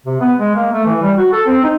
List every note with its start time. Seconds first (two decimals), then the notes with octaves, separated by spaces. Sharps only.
0.06 C3
0.21 B3
0.38 G#3
0.55 A#3
0.72 A3
0.86 E3
1.02 G3
1.18 F#4
1.32 A4
1.46 C4
1.63 D#4